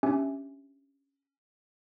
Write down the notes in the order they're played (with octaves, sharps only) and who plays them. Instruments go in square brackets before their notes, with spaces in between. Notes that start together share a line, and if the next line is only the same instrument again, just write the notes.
[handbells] C#4 D4 G4 E5 G#5